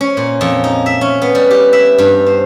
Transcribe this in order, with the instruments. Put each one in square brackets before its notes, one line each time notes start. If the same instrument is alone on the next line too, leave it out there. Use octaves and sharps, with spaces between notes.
[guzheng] C#4
A#2
F2
D#4
E5
C#4
B3
G3
G4
E5
G2
C5